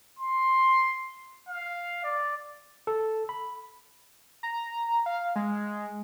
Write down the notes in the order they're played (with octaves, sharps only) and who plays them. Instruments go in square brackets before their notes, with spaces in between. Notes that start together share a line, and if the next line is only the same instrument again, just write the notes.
[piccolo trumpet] C6
F5
D5
[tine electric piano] A4
B5
[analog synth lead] A#5
F5
G#3